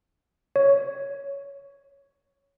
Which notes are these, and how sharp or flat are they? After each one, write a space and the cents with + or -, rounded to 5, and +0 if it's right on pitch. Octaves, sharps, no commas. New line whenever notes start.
C#5 +10